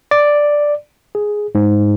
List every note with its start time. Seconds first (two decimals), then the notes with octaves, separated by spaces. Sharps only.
0.11 D5
1.15 G#4
1.55 G#2